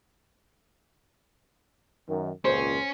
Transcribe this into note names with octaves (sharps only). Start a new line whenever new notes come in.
F#2 D#3
G#1 C#2 A#2 C#4 C5